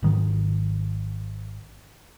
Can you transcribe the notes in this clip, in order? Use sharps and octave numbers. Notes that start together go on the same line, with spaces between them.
G#1 D#3 F#3